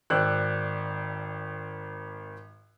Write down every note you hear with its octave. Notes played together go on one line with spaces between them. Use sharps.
G#1 C5 D5 G5 E6 F#6